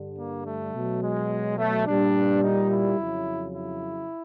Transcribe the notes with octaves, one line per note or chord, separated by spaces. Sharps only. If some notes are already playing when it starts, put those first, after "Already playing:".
Already playing: G2 D3 G3
A#3
A3
B2 F#3
G#3
A3
A#2 G3 D4
D#4
E4
F2 C#3 F#3
E4